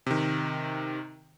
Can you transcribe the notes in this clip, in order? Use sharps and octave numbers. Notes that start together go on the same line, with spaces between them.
C3 D#3